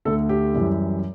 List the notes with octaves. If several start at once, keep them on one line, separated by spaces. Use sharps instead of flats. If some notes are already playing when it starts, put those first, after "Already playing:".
D2 D3 A3 A4
G4
F#2 E3 G3